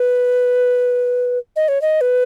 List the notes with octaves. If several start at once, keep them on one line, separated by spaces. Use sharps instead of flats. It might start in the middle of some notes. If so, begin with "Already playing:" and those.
Already playing: B4
D#5
C#5
D#5
B4